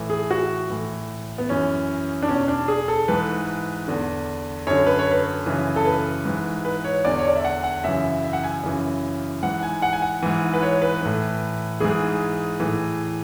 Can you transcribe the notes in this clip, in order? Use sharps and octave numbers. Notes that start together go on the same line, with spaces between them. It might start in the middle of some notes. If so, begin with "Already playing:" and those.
Already playing: A2 E3
G#4
F#4
A2 E3
B3
F#2 E3 C#4
D4
E2 B2 C#4
D4
G#4
A4
G#2 E3 B4
E2 D3
F#2 D3 C#5
B4
C#5
B4
F#2 C#3 E3
A4
B4
G#2 E3
B4
C#5
E2 D3 D5
C#5
D5
E5
F#5
F#5
F#2 C#3 E3 E5
E5
F#5
G#5
F#2 C#3 E3
G#2 E3 F#5
G#5
F#5
G#5
F#5
G#2 E3
B4
C#5
B4
A2 E3
G#2 E3 G#4
A2 E3